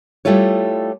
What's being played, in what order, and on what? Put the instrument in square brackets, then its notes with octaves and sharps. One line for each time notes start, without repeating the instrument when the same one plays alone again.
[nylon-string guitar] G3 A3 E4 F4 C#5